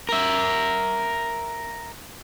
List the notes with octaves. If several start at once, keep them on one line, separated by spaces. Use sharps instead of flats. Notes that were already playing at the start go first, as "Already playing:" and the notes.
A#4 E5